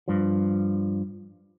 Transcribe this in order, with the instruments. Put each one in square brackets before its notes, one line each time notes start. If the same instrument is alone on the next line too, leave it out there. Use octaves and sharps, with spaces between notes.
[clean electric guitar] G2 F3